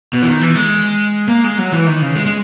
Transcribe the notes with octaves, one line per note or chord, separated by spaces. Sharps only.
B2
E3
D#3
E3
G#3
A#3
G#3
F#3
E3
D#3
C#3
G#3
G#3